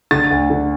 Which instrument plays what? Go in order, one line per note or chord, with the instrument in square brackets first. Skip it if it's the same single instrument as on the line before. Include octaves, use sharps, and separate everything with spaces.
[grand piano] D3 A6
D2
D3